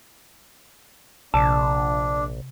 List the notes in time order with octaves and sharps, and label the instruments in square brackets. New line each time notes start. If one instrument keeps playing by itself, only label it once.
[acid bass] A#1 [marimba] C3 [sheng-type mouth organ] D4 [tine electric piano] A5